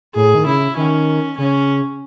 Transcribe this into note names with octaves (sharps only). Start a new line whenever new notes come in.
A2 G#4
D#3
C#3 E4
D#3 C#4
C#3 C#4